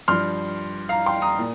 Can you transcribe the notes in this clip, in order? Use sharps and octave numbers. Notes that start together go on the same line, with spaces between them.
G2 F3 C6 F6
F5 A#5
G5 C6
A#5 D#6
A#2